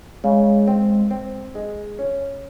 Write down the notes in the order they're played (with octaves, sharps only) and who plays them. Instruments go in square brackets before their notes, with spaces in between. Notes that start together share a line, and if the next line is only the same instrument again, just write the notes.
[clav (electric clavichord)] C#3 [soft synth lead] G#3
[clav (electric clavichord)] C4
C4
G#3
C#4